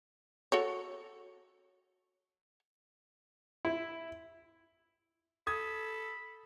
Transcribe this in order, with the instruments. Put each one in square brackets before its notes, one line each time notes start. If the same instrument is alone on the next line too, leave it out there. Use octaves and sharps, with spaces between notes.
[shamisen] F#4 A4 C#5
[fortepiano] E4
[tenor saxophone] A4 [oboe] B5 [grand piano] D#6 G#6